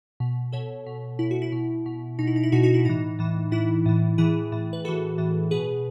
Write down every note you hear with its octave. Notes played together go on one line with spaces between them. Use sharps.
B2
B2 A4 C#5
B2
B2 E4
F#4
E4
B2
B2
B2 D#4
E4
D#4
E4
B2 D#4 F#4
D#4 F#4
E4
A2 E3 D#4
A2 E3
A2 E3 E4
A2 E3
A2 E3 E4 G#4
A2 E3
B4
A2 E3 F#4 A4
A2 E3
B2 G#4 B4